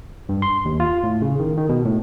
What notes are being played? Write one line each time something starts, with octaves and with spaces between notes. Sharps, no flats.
G2
C6
D#2
F4
A2
C#3
D#3
D#3
B2
A2